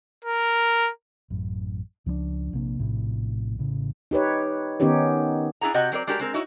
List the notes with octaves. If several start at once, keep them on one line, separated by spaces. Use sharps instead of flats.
A#4
A1 F#2
C#2 F3 G3 D4
A#1 C3 A#3 D4
A#1 A2 C3
A1 A2 C#3
D#4 G4 B4 C#5
D#3 B3 C#4 D#4 G4 C#5
D4 E4 G#4 F#5 A#5
C3 F#4 D#5 F#5 G5
F#3 C4 A#4 D5
G#3 D4 F#4 G4 A#4
G#3 C4 A#4
D#4 E4 F#4 C#5